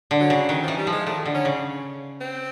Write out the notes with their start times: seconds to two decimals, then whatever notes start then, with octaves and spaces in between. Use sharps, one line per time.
0.11 D3
0.20 F#3
0.30 C#3
0.49 D#3 F#3
0.63 E3 F3
0.77 G3
0.87 F3
0.92 G#3
1.06 D#3 A3
1.25 D3
1.35 C#4
1.45 C#3
2.21 C4